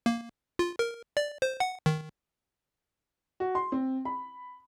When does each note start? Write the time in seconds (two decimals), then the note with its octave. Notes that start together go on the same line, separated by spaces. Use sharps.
0.06 A#3
0.59 F4
0.79 A#4
1.17 D5
1.42 C5
1.60 F#5
1.86 D#3
3.40 F#4
3.55 C6
3.72 C4
4.05 B5